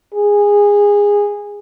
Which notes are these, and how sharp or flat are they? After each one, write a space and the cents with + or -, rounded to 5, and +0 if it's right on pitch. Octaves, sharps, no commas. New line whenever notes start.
G#4 -20